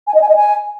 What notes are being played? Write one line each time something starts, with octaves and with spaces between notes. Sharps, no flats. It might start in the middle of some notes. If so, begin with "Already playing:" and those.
G#5
D#5
G#5
D#5
G#5